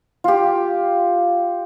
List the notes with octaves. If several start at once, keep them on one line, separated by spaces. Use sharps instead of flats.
F4 G4